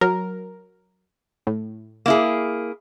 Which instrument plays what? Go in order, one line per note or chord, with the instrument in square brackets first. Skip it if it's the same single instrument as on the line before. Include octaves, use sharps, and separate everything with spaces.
[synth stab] F#3 A#4
A2
[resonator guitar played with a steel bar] A#3 E4 G#4